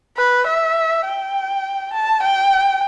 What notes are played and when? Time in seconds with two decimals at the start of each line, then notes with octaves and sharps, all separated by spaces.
0.17 B4
0.47 E5
1.06 G5
1.93 A5
2.23 G5